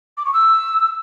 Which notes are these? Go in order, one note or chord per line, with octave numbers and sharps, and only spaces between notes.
D6
C#6
E6